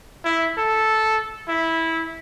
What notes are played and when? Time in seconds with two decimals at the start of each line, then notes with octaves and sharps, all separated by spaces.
0.25 E4
0.58 A4
1.48 E4